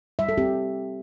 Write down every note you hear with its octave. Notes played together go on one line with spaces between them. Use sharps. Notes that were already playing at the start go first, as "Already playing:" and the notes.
G3 E5
A4
C4 G4